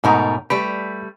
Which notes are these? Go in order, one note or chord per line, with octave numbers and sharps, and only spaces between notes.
G#2 B2 A3 D#4 A#4
G3 A3 G4 B4